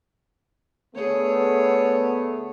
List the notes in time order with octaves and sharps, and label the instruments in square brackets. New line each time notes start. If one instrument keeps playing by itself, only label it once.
[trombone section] D3 A3 B3 [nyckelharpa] G#4 C#5